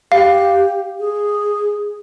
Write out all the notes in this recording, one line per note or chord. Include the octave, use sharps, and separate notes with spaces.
G4 F5
G#4